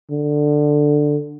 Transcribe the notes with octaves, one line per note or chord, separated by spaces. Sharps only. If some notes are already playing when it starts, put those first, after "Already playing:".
D3